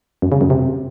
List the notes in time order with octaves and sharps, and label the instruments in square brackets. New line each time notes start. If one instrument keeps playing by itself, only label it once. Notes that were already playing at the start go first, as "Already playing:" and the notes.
[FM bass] F#2
C#3
F#2
C3